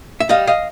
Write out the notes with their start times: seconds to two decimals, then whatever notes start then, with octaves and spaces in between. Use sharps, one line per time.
0.20 E5
0.29 G3 D#5 F5
0.47 D#5 F5